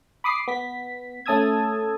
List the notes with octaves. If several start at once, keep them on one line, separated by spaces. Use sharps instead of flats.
B5 D6 D#6 C7
B3 B6
A3 C#4 A5 D#6 E6 G#6